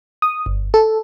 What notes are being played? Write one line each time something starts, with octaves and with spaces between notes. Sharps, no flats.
D#6
G1
A4